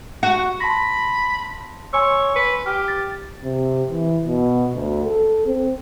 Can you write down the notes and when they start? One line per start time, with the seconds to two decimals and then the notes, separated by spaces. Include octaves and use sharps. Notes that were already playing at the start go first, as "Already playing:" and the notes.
0.23 F#4
0.60 A5 B5 C6 A#6
1.93 C#5 G#5 C6 E6
2.36 B4
2.66 G4 F6
2.88 A6
3.44 C3
3.91 E3
4.27 B2
4.75 D2
5.04 A4
5.46 C4